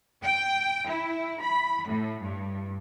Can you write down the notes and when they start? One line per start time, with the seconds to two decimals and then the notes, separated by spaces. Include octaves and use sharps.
0.25 G5
0.87 E4
1.41 B5
1.87 A2
2.22 G2